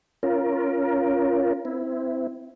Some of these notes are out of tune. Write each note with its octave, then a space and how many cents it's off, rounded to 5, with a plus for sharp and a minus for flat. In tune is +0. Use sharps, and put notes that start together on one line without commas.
C#4 +0 F4 -15 A#4 +15
C4 -20 E4 +0